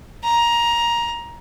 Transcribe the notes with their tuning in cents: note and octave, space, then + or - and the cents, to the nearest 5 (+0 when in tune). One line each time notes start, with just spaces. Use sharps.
A#5 +15